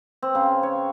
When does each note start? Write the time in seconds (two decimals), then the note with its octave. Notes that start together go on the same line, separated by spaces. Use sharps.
0.22 C4
0.35 C#3
0.63 C#5